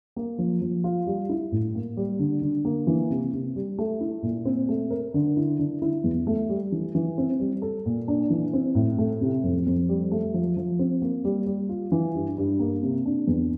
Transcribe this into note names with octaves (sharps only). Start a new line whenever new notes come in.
A#3
F3
F3
F4
G3
E4
A2
A#3
G3
D3
D3
A#3
E3
C3
C3
G3
A3
E4
A#2
C4
A3
A#4
D3
E4
D3
E4
E2
A3
G3
E3
E3
C4
G3
A4
A#2
D4
E3
C4
A2
A3
C3
F2
F2
G3
A3
F3
F3
C4
A#3
G3
G3
F4
E3
G2
G2
A#3
C3
D4
E2